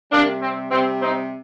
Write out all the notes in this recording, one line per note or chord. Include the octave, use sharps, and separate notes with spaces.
C3 G3 A#3 D4
C4
C3 G3 C4
C4 D#4